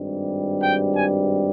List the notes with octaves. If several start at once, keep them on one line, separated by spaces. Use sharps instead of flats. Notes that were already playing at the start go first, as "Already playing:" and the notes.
Already playing: G#1 G2 G3
G5
G#5